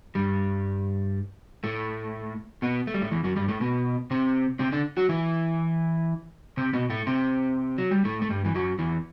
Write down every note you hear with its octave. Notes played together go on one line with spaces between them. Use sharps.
G2 G3
A2 A3
B2 B3
A3
G3
A2 A3
E2 E3
F#2 F#3
G2 G3
A2 A3
B2 B3
C3 C4
C3 C4
D3 D4
F#3 F#4
E3 E4
C3 C4
B2 B3
A2 A3
C3 C4
F#3
G3
A2 A3
A3
G2 G3
E3
F#2 F#3
E2 E3